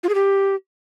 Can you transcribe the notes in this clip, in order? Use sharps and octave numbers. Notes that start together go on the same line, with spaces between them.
F4
G#4
G4